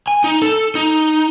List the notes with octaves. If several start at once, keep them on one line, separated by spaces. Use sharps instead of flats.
G#5
D#4
A4
D#4